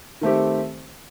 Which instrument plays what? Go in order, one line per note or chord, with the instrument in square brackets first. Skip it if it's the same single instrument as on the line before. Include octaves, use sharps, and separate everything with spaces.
[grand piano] D#3 A3 C4 G4